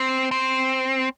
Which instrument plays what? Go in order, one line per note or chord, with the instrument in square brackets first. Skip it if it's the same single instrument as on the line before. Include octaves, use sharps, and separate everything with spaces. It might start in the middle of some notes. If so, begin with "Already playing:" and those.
Already playing: [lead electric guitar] C4
C4